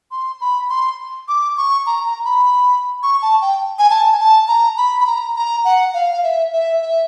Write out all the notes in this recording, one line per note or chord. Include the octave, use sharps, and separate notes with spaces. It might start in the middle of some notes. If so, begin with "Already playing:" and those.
C6
B5
C6
D6
C#6
A#5
A#5
B5
C#6
A5
G5
G#5
A5
G#5
A5
A#5
B5
B5
A#5
A#5
F#5
F5
F5
E5
E5
E5